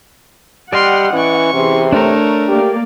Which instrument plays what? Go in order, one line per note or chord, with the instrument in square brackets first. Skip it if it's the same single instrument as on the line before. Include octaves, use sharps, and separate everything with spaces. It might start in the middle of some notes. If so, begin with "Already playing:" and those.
[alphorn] G3 [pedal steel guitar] D5 D#5 G5 [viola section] F#5 [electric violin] C6 F6
[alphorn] E3 [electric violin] C#4 C#6
[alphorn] C3 [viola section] E3 G#4 C6
[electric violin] A3 A#4 [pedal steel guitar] D4 A#5 [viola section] C#5
[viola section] A#3 D5 [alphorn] G4